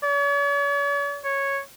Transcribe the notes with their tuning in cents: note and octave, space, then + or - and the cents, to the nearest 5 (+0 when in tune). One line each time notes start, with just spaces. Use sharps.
C#5 +45
C#5 -5